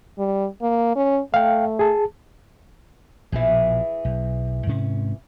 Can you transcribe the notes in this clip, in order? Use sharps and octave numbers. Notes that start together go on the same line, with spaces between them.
G3
A#3
C#4
A3 F5 G5
G#4 A5
A#1 B2 E3 F3 G#4
B1
G#2 C3 C#4